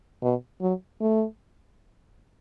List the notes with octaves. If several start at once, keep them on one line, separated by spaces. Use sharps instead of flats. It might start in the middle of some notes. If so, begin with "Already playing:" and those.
B2
F#3
A3